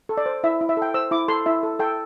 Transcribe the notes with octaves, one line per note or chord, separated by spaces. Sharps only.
A4
D5
C5
E4 E5
E4
E5
A4
G5
C5 E6
E4 D6
A4 C6
E4 E5
A4
A4 G5